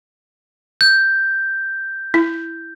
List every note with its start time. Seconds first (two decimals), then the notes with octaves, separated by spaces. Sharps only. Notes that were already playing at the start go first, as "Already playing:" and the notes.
0.81 G6
2.14 E4